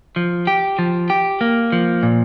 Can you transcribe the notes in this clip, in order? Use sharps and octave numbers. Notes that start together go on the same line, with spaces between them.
F3
G4
F3
G4
A#3
F3
A#2